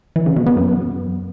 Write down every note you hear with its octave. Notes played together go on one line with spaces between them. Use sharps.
E3
C#3
B2
B3
F#2